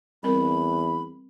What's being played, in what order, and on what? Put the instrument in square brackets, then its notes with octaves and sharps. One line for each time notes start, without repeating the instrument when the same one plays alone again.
[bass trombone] E2 [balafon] G3 C4 A#4 [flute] B5